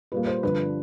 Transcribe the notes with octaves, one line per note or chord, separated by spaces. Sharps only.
A#2 G3 A#3 B4
C5
G2 D3 F3 B4